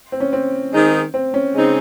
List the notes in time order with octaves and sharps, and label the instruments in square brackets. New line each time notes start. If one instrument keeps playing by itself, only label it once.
[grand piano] C4
C#4
C4
[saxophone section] D#3 G#3 C4 D#4 G#4
[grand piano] C4
C#4
[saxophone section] C#3 G#3 C4 D#4